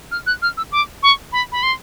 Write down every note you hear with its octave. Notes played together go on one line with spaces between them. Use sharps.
F6
F#6
F6
E6
D6
C#6
B5
B5
C6